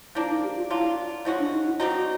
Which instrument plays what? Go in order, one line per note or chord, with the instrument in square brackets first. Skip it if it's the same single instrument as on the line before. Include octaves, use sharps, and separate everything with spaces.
[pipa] F3 A#3 D4 [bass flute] E4
[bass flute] D#4
G4
F4
[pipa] F#3 A#3 D4 F4 [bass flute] E4
[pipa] F3 G#3 C#4 F#4 [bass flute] E4
[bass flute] D4
D#4
E4
[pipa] G3 C4 D#4 [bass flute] F#4